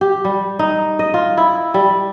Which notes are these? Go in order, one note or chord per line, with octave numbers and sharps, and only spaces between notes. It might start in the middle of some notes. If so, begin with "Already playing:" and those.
G4
G3
D#4
D#5
F4
E4
G3